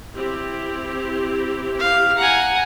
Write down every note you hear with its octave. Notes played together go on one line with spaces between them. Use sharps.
C4 E4 G4
F5
F#5 G#5 A#5